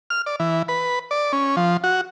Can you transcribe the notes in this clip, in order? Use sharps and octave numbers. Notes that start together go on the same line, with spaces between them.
F6
D5
E3
B4
D5
C#4
F3
F#4